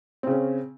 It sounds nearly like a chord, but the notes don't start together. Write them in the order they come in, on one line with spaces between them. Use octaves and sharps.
C4 C#3 C#4